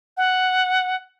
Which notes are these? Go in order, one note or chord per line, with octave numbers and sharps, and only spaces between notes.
F#5